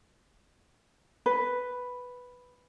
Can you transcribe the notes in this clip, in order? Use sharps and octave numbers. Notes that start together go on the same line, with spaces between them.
B4